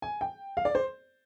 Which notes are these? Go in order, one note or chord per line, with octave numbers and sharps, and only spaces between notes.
G#5
G5
F5
D5
C5